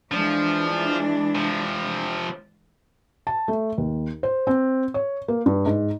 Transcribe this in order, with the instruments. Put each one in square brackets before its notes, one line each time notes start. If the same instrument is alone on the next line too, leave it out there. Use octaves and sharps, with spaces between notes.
[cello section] E3 G#3 D4 [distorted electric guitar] F3
[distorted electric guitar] C3 F3
[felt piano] A5
A3
D#2
C5
C4
C#5
A#3
G2
G#2